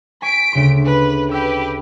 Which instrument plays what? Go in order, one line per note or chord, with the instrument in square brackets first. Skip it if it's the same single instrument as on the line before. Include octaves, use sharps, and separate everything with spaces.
[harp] G#5 C#6 [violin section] B6 D7
[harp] D2 C#3 C6
[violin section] B4
[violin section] G4 B4 [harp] E6 G6